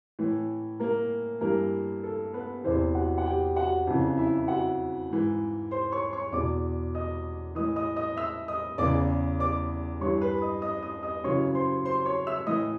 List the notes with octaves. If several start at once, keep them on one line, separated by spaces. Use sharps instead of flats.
A2 E3
A#3 A#4
G2 E3 A#3 A#4
A4
B3 B4
E2 C3 E3 C4 C5
F#4 F#5
F#5
G4 G5
F#4 F#5
F2 C#3 E3
E4 E5
F#4 F#5
G#2 E3
C5 C6
C#5 C#6
C#5 C#6
E2 B2 D5 D6
D#5 D#6
A2 E3 D#5 D#6
D#5 D#6
D#5 D#6
E5 E6
D#5 D#6
E2 C#3 E3 D5 D6
D5 D6
G2 E3 C#5 C#6
B4 B5
D#5 D#6
D#5 D#6
D#5 D#6
D#5 D#6
F#2 C#3 E3 C#5 C#6
C5 C6
C5 C6
C#5 C#6
E5 E6
A2 E3 D#5 D#6